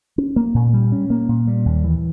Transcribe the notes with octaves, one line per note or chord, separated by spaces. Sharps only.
C#4
A#3
A#2
G3
C#4
A#3
A#2
G3
D#2
E3